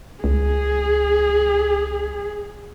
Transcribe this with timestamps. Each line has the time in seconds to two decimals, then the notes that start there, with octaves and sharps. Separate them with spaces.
0.24 C#2 G#4